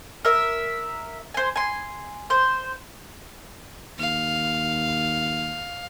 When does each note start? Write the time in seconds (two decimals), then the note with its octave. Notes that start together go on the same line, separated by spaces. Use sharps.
0.25 A#4 E5
1.34 C5 G#5
1.56 G#5 C6
2.30 C5
3.99 D#2 F5